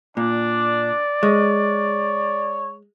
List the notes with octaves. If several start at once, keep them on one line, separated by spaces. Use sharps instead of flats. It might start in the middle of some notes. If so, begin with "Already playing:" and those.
A#2 D4 D5
G#3 C#5